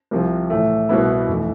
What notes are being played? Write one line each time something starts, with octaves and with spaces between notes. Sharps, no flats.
C2 C3 F3
A2 E3 A3
C2 B2 B3 E4
F1
E3